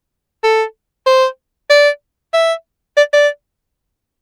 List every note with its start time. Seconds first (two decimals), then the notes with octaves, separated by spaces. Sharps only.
0.44 A4
1.06 C5
1.70 D5
2.34 E5
2.97 D5
3.13 D5